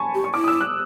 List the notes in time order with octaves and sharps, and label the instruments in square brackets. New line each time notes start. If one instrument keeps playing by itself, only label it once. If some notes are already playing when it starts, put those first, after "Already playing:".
Already playing: [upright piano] G#5 A5 B5 C#6
[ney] G4
[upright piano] C#6
[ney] E4 [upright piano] D6
[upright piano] D#6
E6
F#6